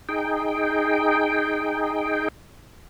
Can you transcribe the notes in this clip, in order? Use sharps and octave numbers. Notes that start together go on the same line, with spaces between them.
D#4 G#4 G5